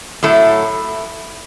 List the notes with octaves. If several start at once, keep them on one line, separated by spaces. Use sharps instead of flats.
A2 F#3 A3 E4 A4